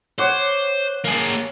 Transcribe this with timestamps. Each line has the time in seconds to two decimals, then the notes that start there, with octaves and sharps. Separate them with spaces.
0.19 C5 C#5 F#5 D6
1.04 A#3 G#4